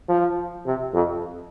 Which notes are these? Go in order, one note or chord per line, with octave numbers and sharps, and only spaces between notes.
F3
C3
F2